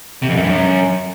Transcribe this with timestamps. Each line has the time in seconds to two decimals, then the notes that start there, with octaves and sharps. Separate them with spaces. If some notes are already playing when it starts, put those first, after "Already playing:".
0.22 C3
0.29 F2
0.36 F#2
0.43 G2
0.49 F#2